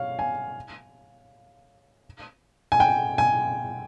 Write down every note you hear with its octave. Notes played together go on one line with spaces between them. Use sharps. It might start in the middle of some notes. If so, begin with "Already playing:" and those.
Already playing: C#5 F5
G#5
G#5
G5
G#5